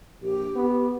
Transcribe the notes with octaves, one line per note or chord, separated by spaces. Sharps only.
A#1 G4
B3